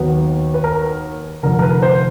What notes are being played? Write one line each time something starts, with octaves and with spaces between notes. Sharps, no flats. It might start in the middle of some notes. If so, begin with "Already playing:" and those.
Already playing: D#2 D#3 F#3 B3
B4
A#4
F1 F2 D3 A#4
A#4
B4
C5